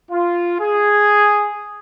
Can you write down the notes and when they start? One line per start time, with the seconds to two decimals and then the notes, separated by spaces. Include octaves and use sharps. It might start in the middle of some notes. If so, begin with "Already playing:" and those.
0.10 F4
0.60 G#4